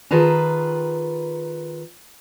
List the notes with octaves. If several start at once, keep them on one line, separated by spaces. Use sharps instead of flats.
D#3 F4 G#4 B4 A5 A#5